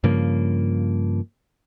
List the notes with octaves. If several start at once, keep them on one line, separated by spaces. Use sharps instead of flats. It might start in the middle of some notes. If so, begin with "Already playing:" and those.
G2 C#3 F3 A#3